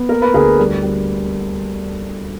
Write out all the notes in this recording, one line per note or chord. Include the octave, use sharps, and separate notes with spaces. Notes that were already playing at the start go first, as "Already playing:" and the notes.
Already playing: B3
A#3 A#4
B4
D2 G#4 A#4
G3
G3